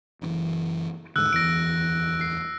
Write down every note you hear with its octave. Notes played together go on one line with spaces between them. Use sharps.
F#1 D3 E3
D#2 G#2 D3 E6 F#6
D1 E2 E3 A#6 D7
C7